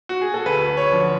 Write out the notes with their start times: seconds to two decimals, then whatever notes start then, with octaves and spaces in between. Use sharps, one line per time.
0.09 F#4
0.21 G#4
0.34 A4
0.46 D2 B4
0.77 C#5
0.92 D3 F3